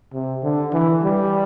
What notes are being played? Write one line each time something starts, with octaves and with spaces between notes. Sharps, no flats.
C3
D3
E3
G3